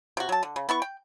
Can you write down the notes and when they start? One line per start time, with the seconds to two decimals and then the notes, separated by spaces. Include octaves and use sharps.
0.17 C3 F#4
0.29 F#3 A5
0.43 D3
0.56 C#3
0.69 B3 E4 C#6
0.82 G5